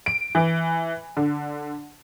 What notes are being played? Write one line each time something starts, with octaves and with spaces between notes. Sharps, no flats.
D7
E3
D3